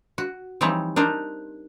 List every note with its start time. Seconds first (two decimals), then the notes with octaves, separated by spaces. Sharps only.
0.18 F#4
0.61 E3 F3 G3 C4 D#4 C#5
0.96 D4 D#4 A#4 C5